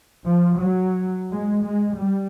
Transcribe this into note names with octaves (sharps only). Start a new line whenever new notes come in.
F3
F#3
G#3
G#3
G3